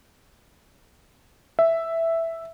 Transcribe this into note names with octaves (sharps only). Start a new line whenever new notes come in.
E5